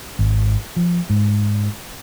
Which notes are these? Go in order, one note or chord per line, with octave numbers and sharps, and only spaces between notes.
G#1
F3
G#2